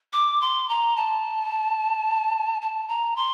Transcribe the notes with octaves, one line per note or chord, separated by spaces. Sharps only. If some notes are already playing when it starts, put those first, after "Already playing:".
D6
C6
A#5
A5
A5
A#5
C6